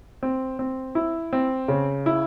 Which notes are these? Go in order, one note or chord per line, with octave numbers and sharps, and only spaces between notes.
C4
C4
E4
C4
C#3
E4